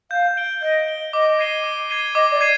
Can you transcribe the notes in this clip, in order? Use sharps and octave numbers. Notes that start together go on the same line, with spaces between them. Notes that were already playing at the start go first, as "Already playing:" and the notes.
F5 G6
D7 G7
D#5 G6
D7 G7
D#5 D6
G#6 C7 D#7 G7
D6
G#6 C7 D#7 G7
D#5 D6
D5
G#6 C7 D#7